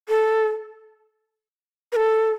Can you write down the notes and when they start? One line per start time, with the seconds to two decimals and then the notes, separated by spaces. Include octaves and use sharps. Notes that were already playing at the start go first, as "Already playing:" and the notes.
0.09 A4
1.92 B4
1.96 A4